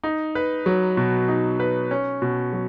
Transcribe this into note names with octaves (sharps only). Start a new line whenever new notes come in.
D#4
B4
F#3
B2
D#4
B4
C#4
B2
F#3